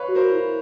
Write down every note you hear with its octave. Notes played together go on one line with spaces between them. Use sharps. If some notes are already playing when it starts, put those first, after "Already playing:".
Already playing: B4 C#5 F5
F#4
A#4 C5
E4